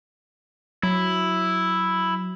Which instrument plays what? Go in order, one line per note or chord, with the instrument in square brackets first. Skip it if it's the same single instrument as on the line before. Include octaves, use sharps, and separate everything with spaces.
[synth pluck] F#3 [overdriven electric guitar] E4